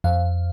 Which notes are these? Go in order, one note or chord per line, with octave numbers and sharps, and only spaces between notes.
F2 F5